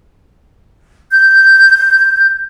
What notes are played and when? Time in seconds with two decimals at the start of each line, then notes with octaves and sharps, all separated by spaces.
1.11 G6